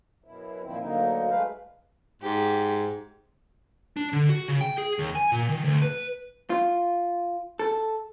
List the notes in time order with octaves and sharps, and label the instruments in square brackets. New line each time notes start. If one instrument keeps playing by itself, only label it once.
[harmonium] F#2 B2 E4
A#2 D#3 F3 C4 E4
D2 D3 F#3 A#3 D#4
G#3 A3 B4 F5
[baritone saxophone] G#2 [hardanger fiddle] G4
[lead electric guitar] D4
D3
F#4
C#3
G5
G#4
D#2
G#5
A#2
D#3
D2
B4
[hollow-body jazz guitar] F4
A4